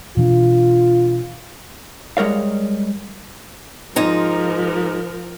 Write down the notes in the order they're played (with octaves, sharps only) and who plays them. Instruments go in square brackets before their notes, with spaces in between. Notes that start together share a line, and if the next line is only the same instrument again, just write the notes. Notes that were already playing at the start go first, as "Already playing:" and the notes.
[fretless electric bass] B2 E3 D4 [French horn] F4
[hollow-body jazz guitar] G3 G#3 A#4 C#5 F5
[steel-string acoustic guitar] G#2 D#4 A#5 [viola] F3 A#4